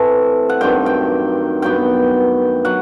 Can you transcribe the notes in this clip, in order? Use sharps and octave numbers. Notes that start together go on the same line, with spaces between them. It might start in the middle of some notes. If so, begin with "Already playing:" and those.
Already playing: A2 E3 A3 C4 E5
F#5
G2 D#3 F#3 C4 G5
G5
G2 F#3 B3 G5
F#3 F#5